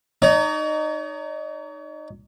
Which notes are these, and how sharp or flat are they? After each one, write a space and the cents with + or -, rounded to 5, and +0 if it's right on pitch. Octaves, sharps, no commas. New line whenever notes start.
D#4 -20 C#5 +40